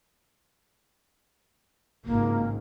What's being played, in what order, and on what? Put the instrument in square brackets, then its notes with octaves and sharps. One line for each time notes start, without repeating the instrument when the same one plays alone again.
[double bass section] G#1 C#2 G#2 [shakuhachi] A#3